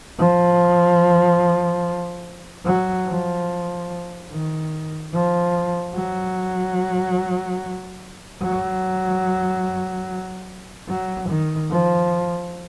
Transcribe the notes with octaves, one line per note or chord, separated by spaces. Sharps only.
F3
F#3
F3
D#3
F3
F#3
F#3
F#3
D#3
F3